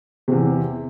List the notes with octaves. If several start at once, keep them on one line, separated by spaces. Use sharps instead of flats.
E2 C3